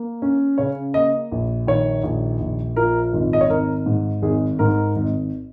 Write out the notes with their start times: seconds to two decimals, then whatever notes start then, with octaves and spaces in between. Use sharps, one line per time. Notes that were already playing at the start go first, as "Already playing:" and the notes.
Already playing: A#3
0.22 C#4
0.58 C#3 C#5
0.94 A#3 D#5
1.32 A#1
1.67 D#3 C#5
2.04 A#1
2.40 A#1
2.76 F3 A#4
3.14 G#1
3.33 D#5
3.41 C#5
3.49 G#1 A#4
3.86 G#2
4.22 G#1 G#4
4.59 G#2 A#4
4.96 G#1